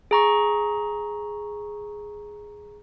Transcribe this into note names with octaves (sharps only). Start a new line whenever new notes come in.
G#4 A#5 C#6